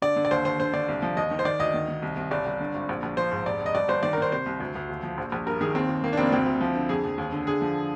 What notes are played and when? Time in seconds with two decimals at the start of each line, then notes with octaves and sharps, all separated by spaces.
0.02 D3 D5
0.16 D3
0.25 D5
0.31 D#2 C5
0.45 D#2 C5
0.60 D3 C5
0.73 D3 D5
0.89 C2
1.02 F3
1.17 D#2 D#5
1.31 D#3
1.39 C5
1.45 D#3 D5
1.59 D2 D#5
1.74 D#3
1.88 D#3
2.02 C2
2.17 C2
2.31 G1 D5
2.46 G1
2.60 D3
2.75 G#1
2.89 A#1
3.03 A#1
3.17 F3 C5
3.32 G#2
3.46 F1 D5
3.61 F1
3.66 D#5
3.75 G1 D5
3.89 G1 C5
4.03 D#3 D5
4.13 A#4
4.18 D#3 C5
4.32 C3 C5
4.46 C2
4.60 D2
4.75 D2
4.89 D#2
5.03 F3
5.18 A#1
5.32 A#1
5.46 G2 A#4
5.61 D#3 G#4
5.75 D#2 C4
5.89 D#2
6.04 D#3 A#3
6.13 D4
6.17 F1 C4
6.32 D2 C4
6.46 D2
6.61 F3
6.76 D3
6.89 F2 G#4
7.04 F2
7.18 D#2
7.32 D3
7.47 D3 G#4
7.61 F3